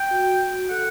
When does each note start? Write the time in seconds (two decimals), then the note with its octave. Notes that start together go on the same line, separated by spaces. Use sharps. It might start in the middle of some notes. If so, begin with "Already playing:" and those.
Already playing: G5
0.11 F#4
0.70 A4 F#5